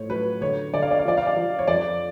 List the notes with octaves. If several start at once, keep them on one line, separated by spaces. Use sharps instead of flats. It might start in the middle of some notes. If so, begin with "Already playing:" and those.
Already playing: A2 F3 C#5
F#3 B4
D3 C#5
D3 D5
F5
D5
F5
F3 D5
F5
D5
F3
C#5
F2 D5